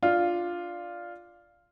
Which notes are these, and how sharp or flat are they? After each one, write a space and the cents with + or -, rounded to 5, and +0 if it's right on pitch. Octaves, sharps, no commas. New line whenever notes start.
D4 +0 F4 +0